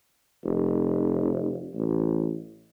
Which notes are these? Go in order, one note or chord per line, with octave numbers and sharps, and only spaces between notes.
F1
A1